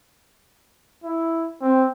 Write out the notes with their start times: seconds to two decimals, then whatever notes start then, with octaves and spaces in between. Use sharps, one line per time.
1.04 E4
1.62 C4